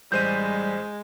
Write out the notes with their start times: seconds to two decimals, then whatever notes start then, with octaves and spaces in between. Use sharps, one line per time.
0.12 A1 G3 G#3 C5 G6 D#7